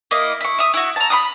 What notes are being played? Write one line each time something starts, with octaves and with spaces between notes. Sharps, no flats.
A#3 E4 D#5
E4 C#6
E5 D#6
E4 F#4
A5 A#5
B5 C6 D#6